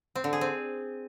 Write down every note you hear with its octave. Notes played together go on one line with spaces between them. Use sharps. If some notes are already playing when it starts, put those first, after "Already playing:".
C4
D3
G#4
C4